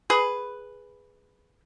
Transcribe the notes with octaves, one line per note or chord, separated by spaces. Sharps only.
G#4 B4